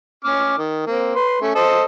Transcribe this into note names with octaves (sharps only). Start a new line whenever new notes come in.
C#4 D6 F6
D#3
A#3 C4
B4 C6
A3 C#4
A4 C5 D#5